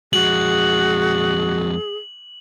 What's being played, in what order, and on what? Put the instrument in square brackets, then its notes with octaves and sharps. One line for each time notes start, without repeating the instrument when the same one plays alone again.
[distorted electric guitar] F2 G#3 [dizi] F#4 [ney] G#4 [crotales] F#7